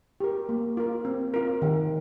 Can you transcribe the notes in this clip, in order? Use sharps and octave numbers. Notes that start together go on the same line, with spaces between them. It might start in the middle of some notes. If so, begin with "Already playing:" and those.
G4 A#4
A#3
F4 A#4
C4
F4 A#4
D#3